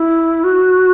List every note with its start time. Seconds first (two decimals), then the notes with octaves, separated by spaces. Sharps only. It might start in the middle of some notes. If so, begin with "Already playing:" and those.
Already playing: E4
0.44 F#4